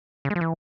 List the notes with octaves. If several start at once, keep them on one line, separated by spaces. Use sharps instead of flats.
C#3
G#3
F3
E3